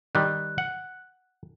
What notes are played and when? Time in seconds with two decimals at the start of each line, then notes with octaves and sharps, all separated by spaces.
0.15 D#3 G3 F#6
0.58 F#5